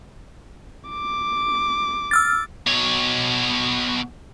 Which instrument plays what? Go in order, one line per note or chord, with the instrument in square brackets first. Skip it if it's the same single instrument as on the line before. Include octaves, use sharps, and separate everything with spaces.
[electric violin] D6
[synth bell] E6 F6 A6
[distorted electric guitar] B2 C#5